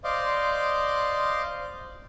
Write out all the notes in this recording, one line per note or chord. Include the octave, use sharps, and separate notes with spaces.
C5 D5 D#5 F5 C6 D6